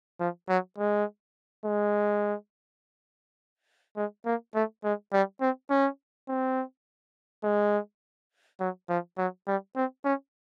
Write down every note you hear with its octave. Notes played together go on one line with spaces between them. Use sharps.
F3
F#3
G#3
G#3
G#3
A#3
A3
G#3
G3
C4
C#4
C4
G#3
F#3
F3
F#3
G3
C4
C#4